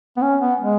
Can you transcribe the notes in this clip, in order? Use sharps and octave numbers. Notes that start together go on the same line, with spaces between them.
B3
C#4
B3
G#3